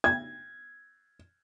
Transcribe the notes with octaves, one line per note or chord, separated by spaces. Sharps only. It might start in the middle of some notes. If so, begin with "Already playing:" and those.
G#6